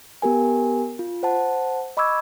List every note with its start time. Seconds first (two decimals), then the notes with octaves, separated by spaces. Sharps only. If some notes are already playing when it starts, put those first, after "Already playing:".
0.22 B3 G4 A#4 G#5
0.99 F4
1.23 C5 F#5 A5
1.97 D#5 B5 C#6 D6 E6 G#6